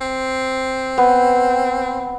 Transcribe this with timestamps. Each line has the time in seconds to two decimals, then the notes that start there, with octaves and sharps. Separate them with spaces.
0.01 C4
0.98 B3